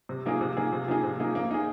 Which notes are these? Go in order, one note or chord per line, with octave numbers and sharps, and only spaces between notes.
C3
F3 A#3 D#4 G#4
C3
F3 A#3 D#4 G#4
C3
F3 A#3 D#4 G#4
C3
F3 A#3 D#4 G#4
A#3
D#4 G#4